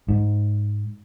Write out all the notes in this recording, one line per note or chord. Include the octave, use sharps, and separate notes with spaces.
G#2